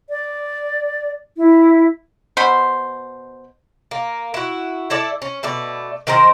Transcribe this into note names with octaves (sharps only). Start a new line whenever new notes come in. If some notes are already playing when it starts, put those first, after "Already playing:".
D5
E4
B2 C5 B5
A#3
E4 F#4
E4 A4 D5
C#4
B2 A3 D5
D#3 C4 A#4 C5